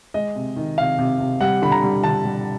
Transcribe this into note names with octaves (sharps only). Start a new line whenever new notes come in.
G#3 D#5
C3
D#3
C3 F5
C3
C3
G3 F#5
D3 B5
A#5
G3
D3 A5
G3